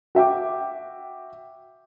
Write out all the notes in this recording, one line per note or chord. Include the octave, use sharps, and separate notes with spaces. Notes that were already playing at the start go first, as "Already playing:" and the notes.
F#4 E5 G5 D6